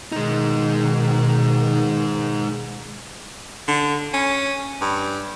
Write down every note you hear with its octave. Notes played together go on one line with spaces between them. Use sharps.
B2 D#3 G#3 D#4
D3
C#4
G2